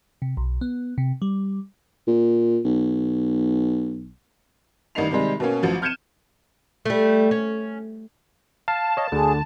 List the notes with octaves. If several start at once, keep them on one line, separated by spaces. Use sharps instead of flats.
C3
B1
B3
C3
G3
A#2
B1
A1 D#3 G3 D#4 C7 F7
C3 D#3 G3 G#3
B2 A#3 C#4
A1 F3 F#3
F6 G6 G#6 C#7 D#7 E7
G3 A3
C#4
F5 A5
C#5 D#5
D2 D3 G#4